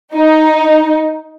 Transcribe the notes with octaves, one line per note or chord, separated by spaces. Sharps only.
D#4